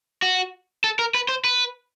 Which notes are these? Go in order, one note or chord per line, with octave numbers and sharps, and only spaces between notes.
F#4
A4
A#4
B4
C5
B4